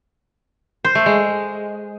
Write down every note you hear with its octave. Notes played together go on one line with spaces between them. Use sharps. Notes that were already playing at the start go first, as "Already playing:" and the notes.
C5
A3
G#3